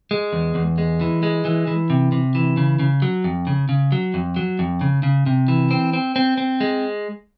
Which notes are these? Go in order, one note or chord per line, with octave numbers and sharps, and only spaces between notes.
G#3
E2
E2
G#3
E3
G#3
E3
E3
C3
C3
E3
C#3
C#3
F#3
F2
C#3
C#3
F#3
F2
F#3
F2
C#3
C#3
C3
E3
C4
C4
C4
C4
G#3